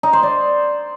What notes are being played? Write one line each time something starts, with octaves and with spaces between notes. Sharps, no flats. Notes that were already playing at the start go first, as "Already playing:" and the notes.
D#4
C5
D5